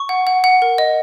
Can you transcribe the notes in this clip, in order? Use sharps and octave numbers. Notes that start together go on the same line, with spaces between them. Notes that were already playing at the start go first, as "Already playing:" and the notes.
Already playing: C#6
F#5
F#5
F#5
A#4
D#5